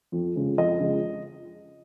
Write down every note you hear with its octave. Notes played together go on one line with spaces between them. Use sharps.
F2
C#3 F3 G#3
F2 D#5
C#3 F3 G#3